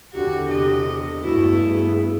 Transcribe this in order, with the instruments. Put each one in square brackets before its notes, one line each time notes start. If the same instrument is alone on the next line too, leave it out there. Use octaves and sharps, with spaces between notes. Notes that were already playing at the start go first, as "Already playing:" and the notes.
[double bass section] E2 D3 [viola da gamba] F#4 [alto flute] G4
[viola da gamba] C3 D#5
[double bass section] G2 B3 [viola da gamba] A3 E4 [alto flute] F#4
[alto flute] G#4